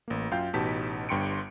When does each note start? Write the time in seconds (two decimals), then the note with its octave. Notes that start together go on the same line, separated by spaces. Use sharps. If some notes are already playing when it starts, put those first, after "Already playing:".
0.08 A1 A#3
0.31 F#2 F4 F5 G5 G6
0.54 A1 B2 D#4 G4 A5 B6
1.09 G1 G2 G5 C6 C#7 D7